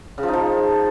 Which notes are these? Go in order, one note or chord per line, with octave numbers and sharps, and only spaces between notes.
C#3
F3
D#4
F3